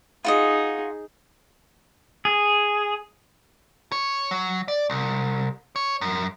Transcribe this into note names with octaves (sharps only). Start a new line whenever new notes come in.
D#4 F4 F#4 G#4 D#5
G#4
C#5
F#3
D5
C2
C#5
F#2